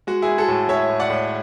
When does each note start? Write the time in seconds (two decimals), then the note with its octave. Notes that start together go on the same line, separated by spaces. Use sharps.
0.07 G#3 F#4
0.22 E4 G#4
0.28 G#3
0.38 F#4 A4
0.48 A2
0.69 A2 C#5 E5
0.90 A2
1.00 D5 F#5
1.10 A2